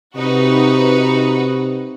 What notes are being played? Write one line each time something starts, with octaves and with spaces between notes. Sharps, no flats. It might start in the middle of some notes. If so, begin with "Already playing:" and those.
C3 D#4 F#4 B4